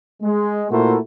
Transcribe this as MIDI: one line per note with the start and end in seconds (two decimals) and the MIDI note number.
0.22 0.65 56
0.71 0.97 46
0.71 0.97 57
0.71 0.97 64
0.71 0.97 66
0.71 0.97 70
0.71 0.97 72